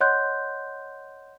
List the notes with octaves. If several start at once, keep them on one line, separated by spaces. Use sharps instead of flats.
C#5 D#5 F#5 C6 F#6 G6